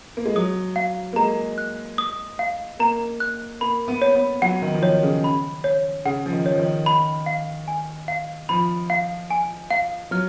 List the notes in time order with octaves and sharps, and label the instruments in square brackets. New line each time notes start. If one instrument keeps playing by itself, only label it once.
[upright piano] A#3
G#3
[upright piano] F#3 [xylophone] D#6
[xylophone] F5
[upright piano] A#3
[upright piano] G#3 [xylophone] A#5
[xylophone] F#6
D#6
F5
[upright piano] A#3 [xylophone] A#5
[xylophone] F#6
[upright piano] A#3 [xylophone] B5
[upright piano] B3
[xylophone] C#5
[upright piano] B3
[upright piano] F#3 [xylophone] F#5
[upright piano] D#3
F3
[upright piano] D#3 [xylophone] C#5
[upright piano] C#3
[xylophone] B5
C#5
[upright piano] C#3 [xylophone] F#5
[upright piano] F3
D#3
[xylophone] C#5
[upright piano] F3
D#3
[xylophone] B5
F5
G#5
F5
[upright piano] F3 [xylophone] B5
[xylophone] F5
G#5
F5
[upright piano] F#3 [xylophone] F6